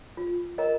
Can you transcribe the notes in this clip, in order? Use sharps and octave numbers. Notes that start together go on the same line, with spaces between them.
F4
A#4 D#5 A#5